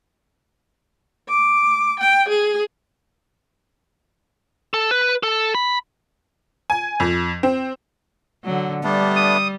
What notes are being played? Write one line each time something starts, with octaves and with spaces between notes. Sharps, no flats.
D6
G5
G#4
A4
B4
A4
B5
G#5
F2
C4
D3 F#3
G3 A3 B3 D4
D#6